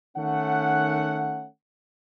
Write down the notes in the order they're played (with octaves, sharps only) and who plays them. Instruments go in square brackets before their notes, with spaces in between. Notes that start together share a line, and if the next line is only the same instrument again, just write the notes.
[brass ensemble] D#3 A3 C#4 F#5